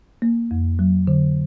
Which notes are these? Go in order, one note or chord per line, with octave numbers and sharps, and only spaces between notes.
A#3
F2
F#3
D3